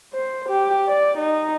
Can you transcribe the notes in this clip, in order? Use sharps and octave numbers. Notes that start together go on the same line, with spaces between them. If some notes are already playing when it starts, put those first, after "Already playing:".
C5
G4
D5
D#4